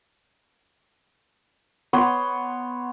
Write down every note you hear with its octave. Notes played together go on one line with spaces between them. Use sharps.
B3 C#5 C6